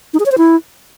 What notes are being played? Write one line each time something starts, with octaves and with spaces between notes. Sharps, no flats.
D#4
G#4
C#5
C5
E4